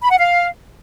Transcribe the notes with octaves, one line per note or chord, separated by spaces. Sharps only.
B5
F#5
F5